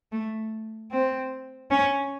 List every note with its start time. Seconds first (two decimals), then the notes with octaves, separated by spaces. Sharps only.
0.12 A3
0.91 C4
1.71 C#4